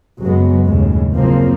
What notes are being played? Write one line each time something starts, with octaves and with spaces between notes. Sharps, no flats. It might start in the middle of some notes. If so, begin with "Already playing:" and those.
F#1 F#3 G#3 B3
D#2 A2 C#3 G#3
F#1 C#3 F3 A#3 C4